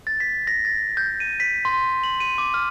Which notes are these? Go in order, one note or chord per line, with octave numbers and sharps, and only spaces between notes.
A6
B6
A#6
A6
G6
D#7
B6
C6
F#7
D#7
D6
F6